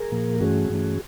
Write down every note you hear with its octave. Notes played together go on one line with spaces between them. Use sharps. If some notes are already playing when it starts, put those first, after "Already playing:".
Already playing: G#4 A#4
A#2 F3 A#3
G2 E3 A3 C#4 F#4 G#4
G2 E3 A3 C#4